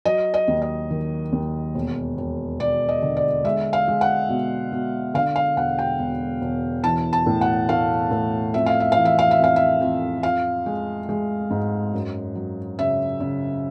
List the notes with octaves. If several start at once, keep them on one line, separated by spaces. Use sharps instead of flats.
F#3 D#5
D#5
D#2
D#5
D#3
D#2
E1
E1
E1 D5
D#5
D3
D5
G#3 E5
F5
G#3
F#5
B2
B2
D3 F5
F5
E1 F#5
G5
E1
E1
E3 A5
A5
A2
F#5
A3 F5
A2
F2 E5
F5
E5
E3 F5
E5
F5
E5
F2 F5
E5
F2
F3 F5
G#3
G#3
G#2
F#2
F#3
C#3 E5
C#3